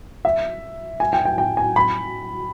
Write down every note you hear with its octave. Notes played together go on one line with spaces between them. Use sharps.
E5
G#5
G5
G5
G5
G#5
B5